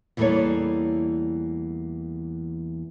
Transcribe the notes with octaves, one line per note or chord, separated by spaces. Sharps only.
E2 E3 G3 A#3 A4 C#5